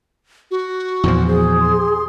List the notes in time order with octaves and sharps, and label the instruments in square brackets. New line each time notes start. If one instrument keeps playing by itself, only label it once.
[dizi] F#4
[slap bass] E2 A#2 F3
[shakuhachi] G#4 [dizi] C5
[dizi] C6